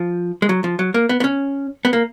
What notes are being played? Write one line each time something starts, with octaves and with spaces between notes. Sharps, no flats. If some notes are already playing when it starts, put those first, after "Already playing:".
Already playing: F3
G#3
F#3
F3
F#3
A#3
B3
B3
C#4
B3
A#3